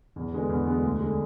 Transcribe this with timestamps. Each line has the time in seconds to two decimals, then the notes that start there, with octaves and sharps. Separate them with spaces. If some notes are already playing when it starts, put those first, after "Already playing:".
0.16 E2
0.33 D3 G#3 B3
0.49 E2
0.66 D3 G#3 B3
0.83 D2
1.00 D3 G#3